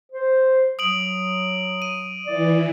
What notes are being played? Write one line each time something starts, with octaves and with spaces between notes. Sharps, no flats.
C5
F#3 D#6 D7 F#7
D#7
E3 D5